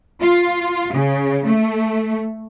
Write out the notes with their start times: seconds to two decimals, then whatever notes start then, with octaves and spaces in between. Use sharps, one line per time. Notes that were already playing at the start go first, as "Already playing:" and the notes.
0.21 F4
0.94 C#3
1.46 A3